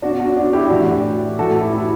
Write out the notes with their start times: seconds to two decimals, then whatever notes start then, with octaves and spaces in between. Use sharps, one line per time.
0.02 B2 D4 F#4
0.20 D4 F#4
0.36 D4 F#4
0.53 E4 G4
0.70 A2 E3 D4 F#4
1.39 A2 E3 F#4 A4
1.61 E4 G4
1.77 E4